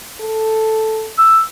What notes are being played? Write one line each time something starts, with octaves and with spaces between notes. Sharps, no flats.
A4
E6